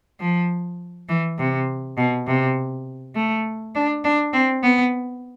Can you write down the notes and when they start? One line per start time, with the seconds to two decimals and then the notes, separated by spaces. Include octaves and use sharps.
0.20 F3
1.09 E3
1.38 C3
1.98 B2
2.27 C3
3.15 A3
3.75 D4
4.04 D4
4.33 C4
4.63 B3